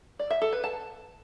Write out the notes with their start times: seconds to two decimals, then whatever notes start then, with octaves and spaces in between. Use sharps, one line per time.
0.19 D5
0.31 E5
0.42 A4
0.53 B4
0.64 A5